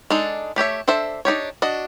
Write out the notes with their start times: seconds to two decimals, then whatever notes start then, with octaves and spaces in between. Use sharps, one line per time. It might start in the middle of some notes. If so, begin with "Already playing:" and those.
0.10 G#3 D4 D#4 A4
0.56 A3 G4 C#5 E5
0.88 D4 A4 C5 E5
1.25 D4 D#4 G4 C#5
1.62 D4 F#4 D#5